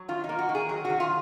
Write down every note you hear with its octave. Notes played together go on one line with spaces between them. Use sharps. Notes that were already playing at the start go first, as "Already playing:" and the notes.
Already playing: F#3
D#3 F4
D#4
A#3
F#4
D#3
G#4
F#3 G#4
F#4
D#3
F4